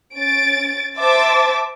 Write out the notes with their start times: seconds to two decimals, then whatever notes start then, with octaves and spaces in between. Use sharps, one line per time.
0.17 C#4 A6 D7
0.97 C5 E5 A5 D6 A6